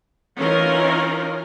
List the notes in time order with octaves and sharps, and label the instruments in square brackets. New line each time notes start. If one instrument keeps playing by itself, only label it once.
[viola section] E3 C#4 D#4 F4 A#4